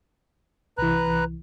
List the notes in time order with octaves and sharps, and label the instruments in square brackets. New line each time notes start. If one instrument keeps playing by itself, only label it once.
[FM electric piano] C2 E3 [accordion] B4 A#5 F#6